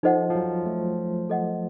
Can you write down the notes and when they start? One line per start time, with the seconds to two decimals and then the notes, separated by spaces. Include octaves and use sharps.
0.03 F3 D#4 A4 C5 D#5 F#5
0.30 F3
0.35 F#3
0.66 A3
1.30 A4 D#5 F#5